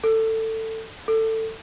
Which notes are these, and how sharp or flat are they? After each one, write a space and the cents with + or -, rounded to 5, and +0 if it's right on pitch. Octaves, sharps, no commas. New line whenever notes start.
A4 +20
A4 +20